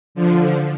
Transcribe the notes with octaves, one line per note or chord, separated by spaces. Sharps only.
D3 F3